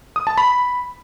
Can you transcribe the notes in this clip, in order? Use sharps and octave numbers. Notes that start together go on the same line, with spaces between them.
D#6
A5
B5